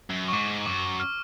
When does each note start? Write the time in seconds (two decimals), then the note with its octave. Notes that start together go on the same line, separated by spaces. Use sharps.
0.10 F#2
0.28 C#6
0.33 G#2 D6
0.66 F#2 D6
1.00 F6